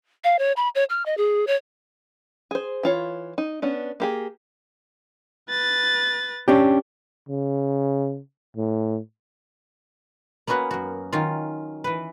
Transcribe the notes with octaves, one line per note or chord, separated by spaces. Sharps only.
F5
C#5
B5
C#5
F6
D#5
G#4
C#5
G#4 C5
E3 F4 C#5
D#4
B3 C#4 D4
A#3 G4 G#4
B4 A6
C#4 D4 G4
C#3
A2
A#3 B3 C#4 F#4 B4 F#5
F#2 F#4
D#3 F#3 C#4 F4
E3 B4